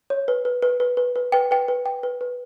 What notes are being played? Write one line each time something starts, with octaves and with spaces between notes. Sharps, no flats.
C#5
B4
B4
B4
B4
B4
B4
B4 G5
B4 G5
B4
G5
B4
B4